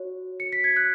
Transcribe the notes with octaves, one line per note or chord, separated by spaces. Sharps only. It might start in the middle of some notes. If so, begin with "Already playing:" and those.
Already playing: F#4 C#5
C#7
B6
G#6
F#6